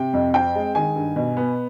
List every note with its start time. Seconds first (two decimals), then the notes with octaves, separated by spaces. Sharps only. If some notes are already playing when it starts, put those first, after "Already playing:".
Already playing: C3 G5
0.14 F2
0.34 C4 G5
0.55 G#3
0.75 D#3 G#5
0.96 G2
1.16 B2
1.37 B3